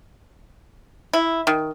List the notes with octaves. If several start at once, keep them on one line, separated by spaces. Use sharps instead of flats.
E4
D#3